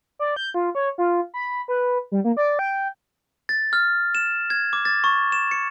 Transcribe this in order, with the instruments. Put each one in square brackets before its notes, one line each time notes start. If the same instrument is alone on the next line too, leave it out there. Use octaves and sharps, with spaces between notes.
[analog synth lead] D5
G6
F4
C#5
F4
B5
B4
G3
A#3
D5
G5
[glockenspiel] A6
F6
E7
G#6
D6
A6
C#6
E7
C#7